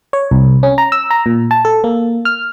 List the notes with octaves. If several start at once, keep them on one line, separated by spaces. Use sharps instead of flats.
C#5
C2
C#4
A#5
E6
A#5
A#2
A5
A4
A#3
F6